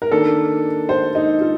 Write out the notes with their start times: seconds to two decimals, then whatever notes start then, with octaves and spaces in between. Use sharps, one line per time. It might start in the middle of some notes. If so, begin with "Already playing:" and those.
0.02 A#4
0.11 D#3 A#3 D4 A4
0.89 C5
1.15 D#4
1.41 F4